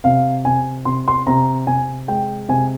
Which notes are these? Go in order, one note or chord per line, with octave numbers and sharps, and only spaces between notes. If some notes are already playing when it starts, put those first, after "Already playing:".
C3 F5
C3 G#5
C3 C6
C6
C3 A#5
C3 G#5
G#3 G5
C3 G#5